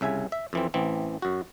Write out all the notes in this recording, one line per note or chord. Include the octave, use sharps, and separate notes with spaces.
C2 C#3 E5 G#5
E5
F2 E3 C4
A1 E3 C4
F#2 F#4